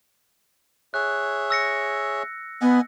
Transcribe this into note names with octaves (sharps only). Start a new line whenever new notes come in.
G#4 C#5 E5 F#6
E6 A#6 C#7
B3 D#5 F#5 G#5